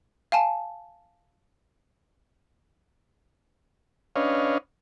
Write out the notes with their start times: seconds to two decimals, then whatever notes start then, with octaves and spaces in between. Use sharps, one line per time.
0.32 F5 G#5 A5
4.16 C#4 D4 B4 C#5 D#5 F5